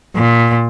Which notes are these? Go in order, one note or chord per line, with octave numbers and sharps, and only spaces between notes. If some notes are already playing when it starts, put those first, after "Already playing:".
A#2